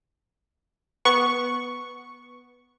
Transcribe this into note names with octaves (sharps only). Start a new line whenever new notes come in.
B3 C#6